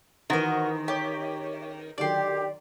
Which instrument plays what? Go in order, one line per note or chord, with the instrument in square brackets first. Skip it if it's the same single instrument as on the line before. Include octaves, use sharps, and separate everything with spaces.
[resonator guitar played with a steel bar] D#3 [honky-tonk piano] E3 C5 A#5 [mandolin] F#4 A#4
[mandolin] G4 [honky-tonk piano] C#5 D6 G6
[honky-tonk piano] D3 D#3 F#3 [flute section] G4 [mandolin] D5 C6